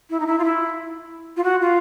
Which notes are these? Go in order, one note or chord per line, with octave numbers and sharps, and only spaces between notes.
E4
D#4
E4
F4
E4
F4
F#4
F4